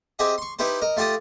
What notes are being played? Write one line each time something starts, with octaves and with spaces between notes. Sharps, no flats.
C4 G4 G#4 D#5 E5
C6 C#6
D#4 E4 G4 B4 C5
A#4 D#5
A3 F4 G4 A5 D#6